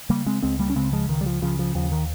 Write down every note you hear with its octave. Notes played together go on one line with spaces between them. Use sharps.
C#3 G3 A#3
G#3 C4
C#2 G#3 C4
G3 A#3
C#4
C#3 G#3 C4
F3 G#3
C#2 D#3
G3
F3
C#3 F3
F3
D#2 F3
D#3